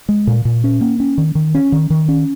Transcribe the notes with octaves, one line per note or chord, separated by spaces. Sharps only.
G#3
A#2
A#2
C#4
A#3
C#4
D#3
D#3
C#4
D#3
D#3
C#4